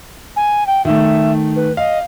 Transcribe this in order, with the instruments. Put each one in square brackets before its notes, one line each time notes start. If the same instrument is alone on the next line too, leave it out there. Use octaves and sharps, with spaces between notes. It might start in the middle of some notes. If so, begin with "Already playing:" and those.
[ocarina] G#5
G5
[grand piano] D#3 A3 [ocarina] E5
[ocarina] B4
[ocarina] D#5 [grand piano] F5